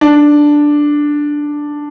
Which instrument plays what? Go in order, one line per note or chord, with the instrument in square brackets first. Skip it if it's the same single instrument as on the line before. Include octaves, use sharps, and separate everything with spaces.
[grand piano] D4